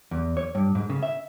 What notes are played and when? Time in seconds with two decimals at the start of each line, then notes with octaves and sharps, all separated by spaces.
0.11 E2
0.37 C#5
0.55 G2
0.75 G#2
0.90 C#3
1.03 E5